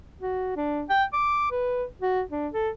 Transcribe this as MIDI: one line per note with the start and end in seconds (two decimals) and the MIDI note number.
0.21 0.55 66
0.56 0.83 62
0.90 1.04 79
1.13 1.51 86
1.51 1.84 71
2.01 2.22 66
2.32 2.48 62
2.54 2.70 69